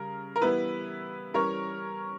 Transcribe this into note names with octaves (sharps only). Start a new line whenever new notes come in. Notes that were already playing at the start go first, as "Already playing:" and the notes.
Already playing: C#3 G3 A#4
A#4
E3 G3 B3 E4 B4
E3 G3 C#4 A#4 C#5